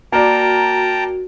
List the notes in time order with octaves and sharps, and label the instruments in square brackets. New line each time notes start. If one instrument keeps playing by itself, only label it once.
[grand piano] A#3 A#4 D5 [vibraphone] F#4 [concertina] G5 A5 A#5